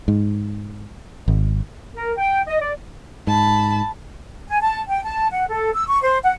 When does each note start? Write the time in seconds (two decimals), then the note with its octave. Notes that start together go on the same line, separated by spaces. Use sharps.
0.08 G#2
1.28 G#1
1.96 A#4
2.17 G5
2.47 D#5
2.61 D5
3.27 G#2 A5 B5
4.49 G#5
4.62 A5
4.89 G5
5.04 A5
5.31 F#5
5.49 A4
5.74 E6
5.87 C#6
6.03 C5
6.25 F#5